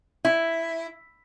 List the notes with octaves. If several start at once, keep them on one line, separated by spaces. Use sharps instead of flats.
E4